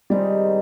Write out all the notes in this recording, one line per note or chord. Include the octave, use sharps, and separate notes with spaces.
C3 D#3 G3 G#3 D#4